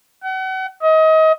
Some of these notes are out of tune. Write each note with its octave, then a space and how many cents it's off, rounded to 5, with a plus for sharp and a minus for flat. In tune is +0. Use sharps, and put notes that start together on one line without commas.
F#5 +35
D#5 +30